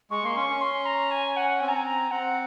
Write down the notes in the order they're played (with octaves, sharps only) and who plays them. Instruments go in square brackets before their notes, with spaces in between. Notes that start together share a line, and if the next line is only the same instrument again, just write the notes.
[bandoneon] G#3 [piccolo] C#6
[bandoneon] A#3 [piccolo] C6
[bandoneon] C#4 [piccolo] C#6
[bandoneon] C#4
[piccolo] C6
A#5
G#5
F#5
[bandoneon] C4 [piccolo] G#5
[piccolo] A#5
G#5
A#5
[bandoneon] C4 [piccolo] F#5